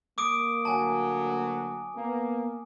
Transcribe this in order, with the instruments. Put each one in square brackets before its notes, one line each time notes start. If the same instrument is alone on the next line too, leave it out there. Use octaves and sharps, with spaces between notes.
[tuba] A#3 [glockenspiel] D6 D#6 D7
[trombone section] D2 F#3 [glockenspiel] G#5 A5
[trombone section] A#3 [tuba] B3